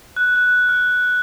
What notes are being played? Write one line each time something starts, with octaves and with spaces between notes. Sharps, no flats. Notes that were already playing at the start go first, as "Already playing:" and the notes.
F#6
F#6
F6